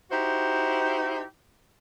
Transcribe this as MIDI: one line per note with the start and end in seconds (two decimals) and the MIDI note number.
0.11 1.23 63
0.11 1.23 64
0.11 1.23 66
0.11 1.23 67
0.11 1.23 72